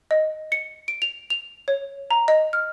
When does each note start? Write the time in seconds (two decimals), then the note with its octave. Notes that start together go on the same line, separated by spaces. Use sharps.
0.11 D#5
0.52 C#7
0.88 D7
1.02 F7
1.30 F7
1.68 C#5
2.11 A#5
2.28 D#5
2.53 F6